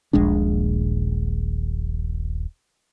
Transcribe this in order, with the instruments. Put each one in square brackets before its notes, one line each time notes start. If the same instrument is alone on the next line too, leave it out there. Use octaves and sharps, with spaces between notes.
[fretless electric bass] D#1 A#1 G#3 D4